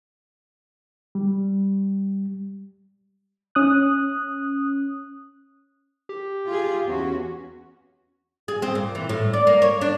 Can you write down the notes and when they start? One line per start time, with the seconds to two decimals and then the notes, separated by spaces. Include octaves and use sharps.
1.15 G3
3.55 C#4 D#6 F#6
6.09 G4
6.48 F4 G#4
6.86 E2 C#4 F#4
8.48 G#4
8.62 C4
8.75 A#2
8.95 E3
9.09 A2
9.33 D5
9.47 A#3
9.62 C#5
9.81 D4